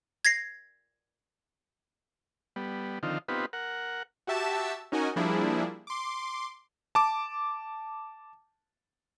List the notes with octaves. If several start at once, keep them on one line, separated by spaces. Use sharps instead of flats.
G#6 A#6 C7
G3 B3
D3 D#3 F3 C4 D#4 F4
B3 C4 D#4 F4 G4 B4
A#4 F#5
F#4 G4 E5 A5 E6
C#4 D#4 F#4 A#4 D#5 G#5
F3 G3 A#3 D4 E4 G#4
C6 D6
A5 D6